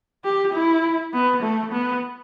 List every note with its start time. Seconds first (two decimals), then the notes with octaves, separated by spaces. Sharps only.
0.24 G4
0.53 E4
1.13 B3
1.42 A3
1.72 B3